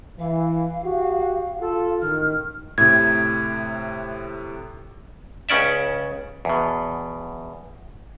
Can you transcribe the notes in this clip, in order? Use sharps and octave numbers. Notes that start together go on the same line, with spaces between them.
E3 F5
F#4 G4
F4 A4
A1 D#3 F6
A2 C3 G#6
C#2 C#3 C#4 D5 E5
E2 B2